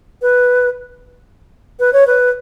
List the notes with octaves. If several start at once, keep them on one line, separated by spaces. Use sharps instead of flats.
B4
B4
C#5
B4